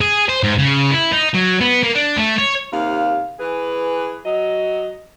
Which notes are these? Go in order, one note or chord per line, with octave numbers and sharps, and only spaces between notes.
G#4
C5
G#2
C#3
E4
D#4
F#3
B3
A#3
D4
A3
C#5
D#2 C3 F5
E3 G#4 B4
F#3 D#5